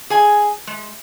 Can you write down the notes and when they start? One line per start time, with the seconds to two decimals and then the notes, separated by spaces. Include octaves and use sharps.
0.10 G#4 G#5
0.67 G#3